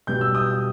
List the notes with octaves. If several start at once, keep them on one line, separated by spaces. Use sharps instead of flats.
B2 G3 G6
E6
D#6 G6